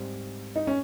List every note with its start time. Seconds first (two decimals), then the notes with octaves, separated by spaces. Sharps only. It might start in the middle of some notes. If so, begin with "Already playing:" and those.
Already playing: G#2 G3 C4
0.56 D#4
0.67 C#4